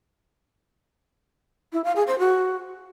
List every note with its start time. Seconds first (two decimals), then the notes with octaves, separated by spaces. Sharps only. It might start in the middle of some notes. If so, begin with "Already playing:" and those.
1.73 E4
1.84 F5
1.96 G#4
2.07 C5
2.19 F#4